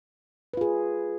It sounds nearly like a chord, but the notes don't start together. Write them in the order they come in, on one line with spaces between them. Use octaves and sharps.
B4 F4 G#4